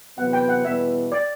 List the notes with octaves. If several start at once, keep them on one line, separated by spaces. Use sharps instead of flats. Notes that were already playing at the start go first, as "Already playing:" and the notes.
E2 C3 F#3 B3 F#5
G5
F#5
E2 B2 G3 B3 E4 E5
D5